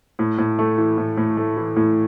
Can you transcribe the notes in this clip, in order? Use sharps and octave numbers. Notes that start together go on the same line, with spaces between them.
A2
A2
A3
E3
A2
A2
A3
E3
A2